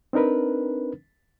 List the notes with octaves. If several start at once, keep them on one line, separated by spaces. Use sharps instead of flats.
C4 D4 D#4 A#4 B4